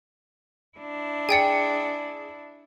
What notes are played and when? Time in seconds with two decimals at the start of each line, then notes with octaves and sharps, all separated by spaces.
0.78 D4 E4
1.29 G#4 D5 G5 G#5 C#7